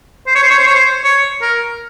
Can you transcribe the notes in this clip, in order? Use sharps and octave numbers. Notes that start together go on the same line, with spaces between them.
C5
C#5
C5
C#5
C5
C#5
C5
C#5
A#4